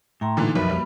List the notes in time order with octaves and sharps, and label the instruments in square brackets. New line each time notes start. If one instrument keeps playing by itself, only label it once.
[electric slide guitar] A2 [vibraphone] G5 A#5 C6
[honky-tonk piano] A#2 D3 E3 [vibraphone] D#4
[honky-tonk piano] B1 [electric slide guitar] F2 B4 [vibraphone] A#4 E5 B5
[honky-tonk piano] G3 [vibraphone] A#3 B5